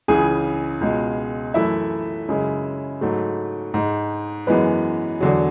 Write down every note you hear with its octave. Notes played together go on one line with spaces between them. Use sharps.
C#2 C#3 E3 G#4 G#5
C#2 B2 G#3
F#2 E3 A3 E4 E5
F#2 C#3 G#3
G#2 F#3 A3
G#2 G#3
F#2 E3 G#3 B3 B4
E2 D3 F#3